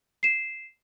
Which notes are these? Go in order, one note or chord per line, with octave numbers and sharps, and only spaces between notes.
C7 E7